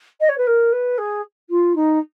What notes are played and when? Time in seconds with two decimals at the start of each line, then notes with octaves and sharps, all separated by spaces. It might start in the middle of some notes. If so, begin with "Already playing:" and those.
0.20 D#5
0.29 C#5
0.37 B4
0.47 A#4
0.72 B4
0.98 G#4
1.49 F4
1.75 D#4